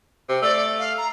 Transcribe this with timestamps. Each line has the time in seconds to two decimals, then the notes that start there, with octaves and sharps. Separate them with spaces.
0.29 C3
0.42 A3 D5
0.79 F5
0.98 A#5